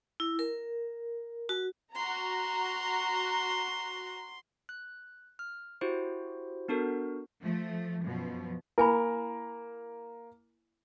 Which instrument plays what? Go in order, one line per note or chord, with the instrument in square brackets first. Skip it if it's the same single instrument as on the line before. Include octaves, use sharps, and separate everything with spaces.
[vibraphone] E4
A#4
F#4
[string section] F#4 A#5 [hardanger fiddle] C6
[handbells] F#6
F6
E4 F#4 G4 C5
B3 D4 F#4 A4 A#4
[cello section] F3 A3
F#2 B2 F3
[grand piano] A#3 A#4 [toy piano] E4 G#5 B5